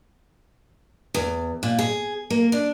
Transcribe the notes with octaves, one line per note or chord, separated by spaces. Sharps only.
E2
A#2
G#4
A#3
D4